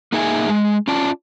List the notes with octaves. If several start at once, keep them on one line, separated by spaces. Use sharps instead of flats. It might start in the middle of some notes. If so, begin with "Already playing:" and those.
A#3 D#4 G#4 E5 G#5
G#3
C#4 F4 D5 A5